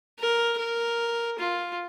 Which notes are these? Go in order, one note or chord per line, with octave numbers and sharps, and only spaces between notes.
A#4
A#4
F4